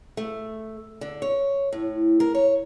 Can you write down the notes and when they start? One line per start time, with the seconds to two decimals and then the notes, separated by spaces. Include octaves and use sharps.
0.17 A3
1.01 D3
1.22 C#5
1.73 A2
2.20 A#4
2.35 C#5